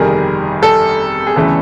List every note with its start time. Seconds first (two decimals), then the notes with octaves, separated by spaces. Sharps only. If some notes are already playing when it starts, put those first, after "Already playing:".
Already playing: G1 F2 C3 D#3 G3 G#4 A#4
0.63 A4
1.27 G#4
1.36 E1 D2 C#3 E3 A3 A4